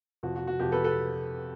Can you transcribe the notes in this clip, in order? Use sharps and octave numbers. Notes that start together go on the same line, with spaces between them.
F2 C3 F3 F#4
F#4
F#4
F2 C3 F3 G4
A4 B4
A4 B4